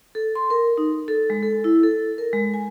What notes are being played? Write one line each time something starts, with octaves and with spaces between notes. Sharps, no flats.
A4
C6
A#4
D#4
A4
G#3
A4
E4
A4
A#4
G#3
G#5